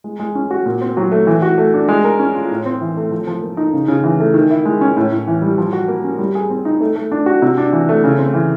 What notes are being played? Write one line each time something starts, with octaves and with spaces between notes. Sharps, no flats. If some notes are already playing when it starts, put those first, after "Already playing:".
G#3
G#3
C#4
F#4
A#2
C4
F#3
A3
E3
F#4
A3
D4
G#3
A#4
C#4
F4
A2
C4
E3
A3
F3
F3
A#3
D#4
C#3
C#3
E3
A3
D#3
E4
G#3
C#4
A2
A2
E3
G3
F3
F#4
A#3
C#4
G3
G#4
C4
D#4
A3
A3
D4
F#4
C3
D4
E3
A3
C#3
C4
E3